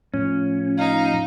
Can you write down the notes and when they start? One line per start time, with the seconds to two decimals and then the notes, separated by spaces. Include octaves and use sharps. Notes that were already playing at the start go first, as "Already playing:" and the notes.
0.14 A2 F3 C#4
0.78 D#4 F5